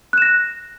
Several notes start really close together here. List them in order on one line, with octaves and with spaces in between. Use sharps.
F#6 E7 A#6